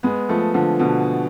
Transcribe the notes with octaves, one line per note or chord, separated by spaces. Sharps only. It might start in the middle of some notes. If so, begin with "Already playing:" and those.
G#3 B3
F3 A3
D3 F3
B2 D3